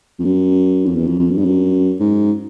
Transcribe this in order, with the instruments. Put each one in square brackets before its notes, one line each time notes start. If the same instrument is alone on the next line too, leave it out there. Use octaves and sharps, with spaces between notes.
[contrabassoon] F2
F#2
F2
E2
F2
F2
F#2
G2
F#2
G#2